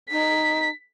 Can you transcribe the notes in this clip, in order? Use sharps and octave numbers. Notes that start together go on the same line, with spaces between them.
D#4 B6